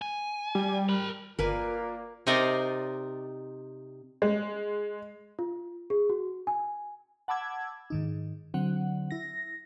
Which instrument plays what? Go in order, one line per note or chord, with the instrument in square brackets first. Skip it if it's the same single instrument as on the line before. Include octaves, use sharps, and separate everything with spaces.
[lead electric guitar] G#5
[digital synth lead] G3
[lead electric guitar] A#4 B5
[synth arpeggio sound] G1 [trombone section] A#3 [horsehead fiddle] F4 D5 [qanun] A#4 B4 G#5
[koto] C3 C4 D#4 A#4 D5
[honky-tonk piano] G#3
[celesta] F4
G#4
F#4
G#5
[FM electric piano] F#5 A5 B5 D6 E6 G#6
G#2 D#3 D#4
D3 F#3 C4 F#5
E4 A#6